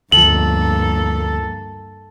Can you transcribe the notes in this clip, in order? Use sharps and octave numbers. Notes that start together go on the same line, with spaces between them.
D2 G2 F3 A#3 A4 F#7